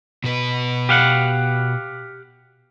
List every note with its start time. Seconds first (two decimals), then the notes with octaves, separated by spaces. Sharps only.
0.24 B2 B4
0.89 G4 F5 F#5